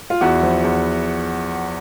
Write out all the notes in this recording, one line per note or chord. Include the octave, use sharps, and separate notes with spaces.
F4
E2 E4 F#4
F3
E2